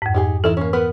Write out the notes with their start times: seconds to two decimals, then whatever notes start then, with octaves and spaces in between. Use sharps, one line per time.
0.02 F2 G#2
0.14 D#4 G4 G#4
0.44 E3 D#4 E4 A4
0.57 A#3 C#4
0.73 B3 A#4 B4